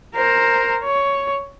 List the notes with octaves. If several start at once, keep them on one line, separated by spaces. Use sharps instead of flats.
A#4 C5
C#5